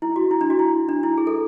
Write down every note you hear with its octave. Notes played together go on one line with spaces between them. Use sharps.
E4
F#4
E4
D4
F#4
E4
D4
E4
G#4
A4